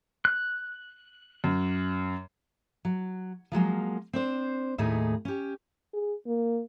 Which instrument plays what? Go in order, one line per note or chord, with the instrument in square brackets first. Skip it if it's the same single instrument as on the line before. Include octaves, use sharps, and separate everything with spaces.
[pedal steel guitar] F#6
[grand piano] F#2
[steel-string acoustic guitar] F#3
F3 F#3 G#3 A#3
C4 D4 C5
D#2 A2 A3 D#4 G#4
C#4 G4
[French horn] G#4
A#3